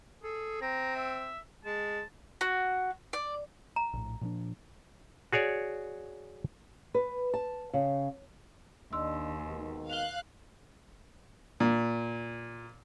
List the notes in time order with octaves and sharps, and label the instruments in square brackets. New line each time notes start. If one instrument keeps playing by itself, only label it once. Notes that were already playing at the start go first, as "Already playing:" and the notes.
[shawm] G#4 [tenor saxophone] A4
[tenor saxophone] C4 [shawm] A#5
[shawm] E5
[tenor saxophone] G#3 [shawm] A5
[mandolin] F#4
D5
[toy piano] A#5
[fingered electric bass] A#1 A2
A#2 F3 D4
[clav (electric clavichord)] F#4 G#4 C#5 D5
[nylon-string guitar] B4
A5
C#3
[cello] D#2 [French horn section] D4 D#5 [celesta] C6 E6
[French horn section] G#2 B2 D#3
[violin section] F5 F#6 [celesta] F7 G7
[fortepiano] A#2